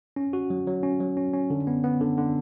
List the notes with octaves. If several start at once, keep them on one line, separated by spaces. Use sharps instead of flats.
C#4
F#4
F#3
F#3
C#4
F#3
C#4
C#4
D3
B3
B3
D3
D3